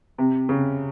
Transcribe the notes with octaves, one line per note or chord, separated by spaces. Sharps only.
C3
C#3